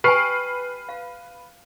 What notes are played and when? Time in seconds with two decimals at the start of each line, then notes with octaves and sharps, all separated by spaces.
0.04 G4 B4 G5 G#5 F6 C7
0.89 F5